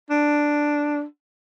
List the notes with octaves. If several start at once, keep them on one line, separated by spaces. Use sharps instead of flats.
D4